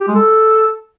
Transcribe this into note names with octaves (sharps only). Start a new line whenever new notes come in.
G4
G#3
A4